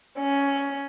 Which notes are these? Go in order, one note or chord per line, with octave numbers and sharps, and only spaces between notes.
C#4